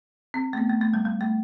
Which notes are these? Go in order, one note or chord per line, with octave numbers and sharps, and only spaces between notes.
C4
A3
B3
A3
A3
G3
G3
A3